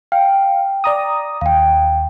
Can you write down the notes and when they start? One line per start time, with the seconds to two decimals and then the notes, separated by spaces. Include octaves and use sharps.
0.12 F5 G5
0.84 D5 A#5 D#6
1.41 D#2 F5 G5